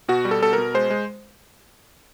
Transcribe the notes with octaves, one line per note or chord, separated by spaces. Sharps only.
B2 F#4
G3
A4
B2 A4
A#4
B2
G#3 C5
G#3